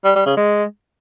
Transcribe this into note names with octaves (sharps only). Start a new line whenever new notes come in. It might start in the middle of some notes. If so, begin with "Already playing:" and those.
G3
G3
C#3
G#3